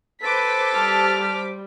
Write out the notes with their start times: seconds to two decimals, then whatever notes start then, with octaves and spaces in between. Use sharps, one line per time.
0.23 A4 B4 C5 D6 B6
0.75 G3 A5 F6